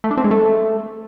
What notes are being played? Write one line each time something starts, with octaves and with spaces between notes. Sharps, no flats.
A3
D4
C4
G#3
A3